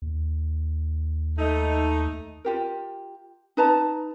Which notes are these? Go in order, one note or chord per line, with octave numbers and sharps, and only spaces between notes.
D#2
A3 D#4
F4 G4 A#4
D#4 B4 A5 A#5